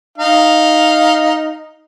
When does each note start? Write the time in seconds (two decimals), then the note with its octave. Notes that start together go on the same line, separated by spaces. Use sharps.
0.18 D#4 F5